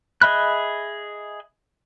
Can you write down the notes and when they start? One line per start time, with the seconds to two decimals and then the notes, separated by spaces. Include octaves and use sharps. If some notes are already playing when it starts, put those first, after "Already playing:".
0.21 G#4 D#5 E5 B5 F#6